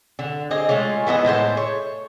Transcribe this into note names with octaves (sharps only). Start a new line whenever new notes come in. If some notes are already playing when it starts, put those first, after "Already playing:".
D3
C4 G4 G#4 D#5
G#3 A3 C#4 F4
E3 B3 A4 D#5
A2 G#3 C5 A5
C#5